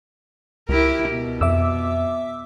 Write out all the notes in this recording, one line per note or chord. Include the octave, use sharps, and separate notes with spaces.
C#2 E4 G4 A#4
B2
F2 E5 D6 E6